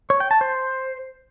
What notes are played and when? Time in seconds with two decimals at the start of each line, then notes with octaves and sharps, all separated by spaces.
0.10 C#5
0.20 G5
0.31 A5
0.41 C5